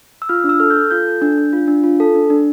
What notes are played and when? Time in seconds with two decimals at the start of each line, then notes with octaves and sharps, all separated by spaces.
0.22 E6
0.29 F4 F6
0.44 D4
0.49 E6
0.60 A4 F6
0.70 G6
0.75 A4
0.91 F4 G6
1.07 A4
1.22 D4
1.38 D4
1.53 F4
1.68 D4
1.84 F4
2.00 A4
2.15 D4
2.30 D4